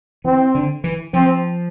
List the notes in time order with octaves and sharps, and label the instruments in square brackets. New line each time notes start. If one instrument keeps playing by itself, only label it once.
[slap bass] E3 [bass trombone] C4
[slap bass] D3
E3
[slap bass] F3 [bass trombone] C4